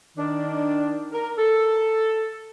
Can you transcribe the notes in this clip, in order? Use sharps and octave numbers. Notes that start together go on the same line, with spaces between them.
D#3 D4
A#4
A4